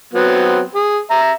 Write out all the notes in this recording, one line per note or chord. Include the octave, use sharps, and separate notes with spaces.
F#3 B3 C4
G#4
E5 A#5